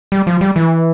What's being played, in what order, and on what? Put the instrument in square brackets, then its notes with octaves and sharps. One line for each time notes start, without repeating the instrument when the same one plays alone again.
[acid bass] G3
F3
G3
E3